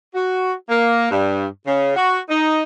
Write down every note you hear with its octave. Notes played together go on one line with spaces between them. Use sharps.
F#4
A#3
G2
C#3
F#4
D#4